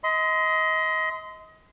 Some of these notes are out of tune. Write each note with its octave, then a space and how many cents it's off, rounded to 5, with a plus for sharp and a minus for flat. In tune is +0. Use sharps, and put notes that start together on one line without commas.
D#5 +30 C6 -25